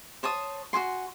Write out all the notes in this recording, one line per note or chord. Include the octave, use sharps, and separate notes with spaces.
C5 C#5 A5 D#6
F#4 G#4 G#5 C6